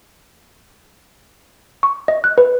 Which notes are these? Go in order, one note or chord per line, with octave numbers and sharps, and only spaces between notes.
C#6
D#5
F#6
B4